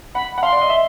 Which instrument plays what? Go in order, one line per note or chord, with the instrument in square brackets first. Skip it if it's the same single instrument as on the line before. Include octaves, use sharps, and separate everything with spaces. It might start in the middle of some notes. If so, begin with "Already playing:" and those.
[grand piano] F#5 [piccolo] B5
[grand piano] F#5
[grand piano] F5 [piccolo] C6
[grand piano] D5
D#5
E5